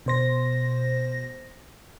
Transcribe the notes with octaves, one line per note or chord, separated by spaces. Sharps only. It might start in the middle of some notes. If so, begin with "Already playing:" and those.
B2 C5 A#6